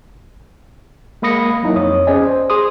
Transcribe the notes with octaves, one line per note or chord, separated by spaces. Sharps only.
G#3 A#3 B5 D#6 A#6 C#7
F#3 A#3 D#4 E4
F2 C#5 D#6
C#4 G#4 C5 D5 D#5 G#5
C5
G#4 C6 D#6